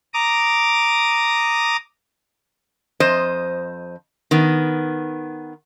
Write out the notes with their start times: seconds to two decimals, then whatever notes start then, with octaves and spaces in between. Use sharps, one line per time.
0.14 A#5 D6 D#6
3.00 F2 C5 D#5
4.31 D#3 B3